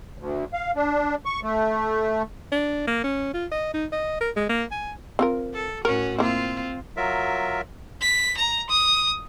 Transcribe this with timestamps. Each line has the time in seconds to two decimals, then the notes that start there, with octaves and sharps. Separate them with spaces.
0.18 D2
0.53 F5
0.76 D4
1.25 C#6
1.43 A3
2.52 D4
2.87 A#3
3.04 C#4
3.33 F4
3.52 D#5
3.74 D#4
3.92 D#5
4.20 A#4
4.36 G#3
4.49 A#3
4.71 G#5
5.19 C4 F4 A#4
5.54 A4
5.85 A2 C#4 F#4 A#4
6.18 A#3 C4 E4 F4
6.97 F#3 F4 A#4 E5
8.02 B6
8.37 A#5
8.70 D#6